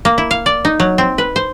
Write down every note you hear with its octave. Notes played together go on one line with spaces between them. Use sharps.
A#3
E4
F5
D5
D#4
F#3
C4
B4
C5